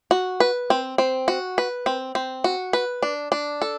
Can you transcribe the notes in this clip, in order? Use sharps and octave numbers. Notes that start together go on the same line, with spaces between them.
F#4
B4
C4
C4
F#4
B4
C4
C4
F#4
B4
D4
D4
A4